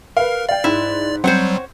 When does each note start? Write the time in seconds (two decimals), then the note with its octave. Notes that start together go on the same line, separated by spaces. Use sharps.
0.17 A#4 B4 F5
0.49 D5 F5 G5
0.64 G#2 E4
1.24 F#3 G3 C4 C5 C#5 F#5